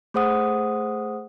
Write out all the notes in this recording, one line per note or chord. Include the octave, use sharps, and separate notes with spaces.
A3 G#4 C5 F#5 D#6